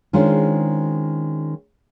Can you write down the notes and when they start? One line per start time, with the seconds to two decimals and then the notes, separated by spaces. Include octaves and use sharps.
0.13 D#3 G#3 C#4 D4 F4 C5